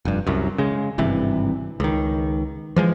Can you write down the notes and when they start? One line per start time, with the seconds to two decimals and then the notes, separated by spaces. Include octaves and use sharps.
0.05 F1 G2
0.27 C2 F#2
0.58 C#3 G#3
0.98 G#1 G2 C3 E3
1.80 C#2 D#3
2.76 E3 F3 G#3